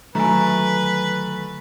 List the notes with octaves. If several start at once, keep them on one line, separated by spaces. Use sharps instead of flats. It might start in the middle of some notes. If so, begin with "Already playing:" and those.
D3 D#3 F#3 A3 B4 G#5 A#5